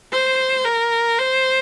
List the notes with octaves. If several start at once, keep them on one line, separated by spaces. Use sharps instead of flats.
C5
A#4
C5